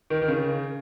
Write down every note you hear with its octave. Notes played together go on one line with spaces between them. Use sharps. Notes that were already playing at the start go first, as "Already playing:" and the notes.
D#3
D#3
C#3